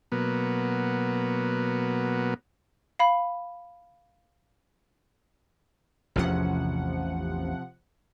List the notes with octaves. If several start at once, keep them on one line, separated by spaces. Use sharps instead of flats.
B2 F#3 A#3 B3
F5 B5
A1 E2 C3 F3 C#4 F#5